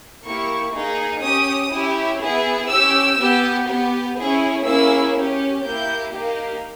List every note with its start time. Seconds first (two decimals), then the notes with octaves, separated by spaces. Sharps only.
0.24 A#3 E4 G4 C#6
0.73 A#3 D#4 G#4
1.22 C#4 G4 D#6
1.71 C#4 E4 G4
2.20 B3 E4 G#4
2.69 C#4 G4 E6
3.18 B3 G4
3.67 B3 G4
4.16 C#4 E4 G#4
4.65 A#3 C#4 E4 G#4 E6
5.15 C#4 G4
5.64 A#3 E4 G4 G6
6.13 A#3 D#4 G4